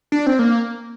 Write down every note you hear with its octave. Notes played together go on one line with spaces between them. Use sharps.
D4
C4
A#3